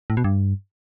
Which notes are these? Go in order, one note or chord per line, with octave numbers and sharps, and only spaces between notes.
A2
B2
G2